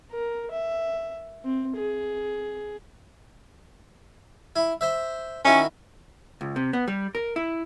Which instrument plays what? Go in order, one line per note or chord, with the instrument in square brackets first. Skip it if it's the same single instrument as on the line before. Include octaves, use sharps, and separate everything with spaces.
[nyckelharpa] A#4
E5
C4
G#4
[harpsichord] E4
C5 E5
[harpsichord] D#3 E4 F#4 [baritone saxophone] C#4
[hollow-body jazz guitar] C#2
C3
B3
G3
A#4
E4